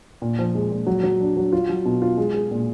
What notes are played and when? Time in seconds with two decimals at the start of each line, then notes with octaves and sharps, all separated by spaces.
0.22 A#2
0.39 F3
0.55 G#3
0.71 A#2
0.86 F#3
1.03 F#3
1.20 D4
1.37 F#3
1.53 F4
1.69 F#3
1.85 B2
2.02 F4
2.17 G#3
2.34 G#4
2.51 A#2